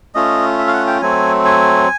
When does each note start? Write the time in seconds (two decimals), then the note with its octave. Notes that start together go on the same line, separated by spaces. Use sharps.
0.15 A3 C#4 F4 D#5
0.58 E5
0.68 F5
0.73 F#5
0.87 G5
1.02 F#3 A3 C4 G#5
1.45 G#5